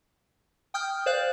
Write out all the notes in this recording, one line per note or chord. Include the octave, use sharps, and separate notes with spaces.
G5 D#6 F6 G6
C5 D5 F5 F#6 G6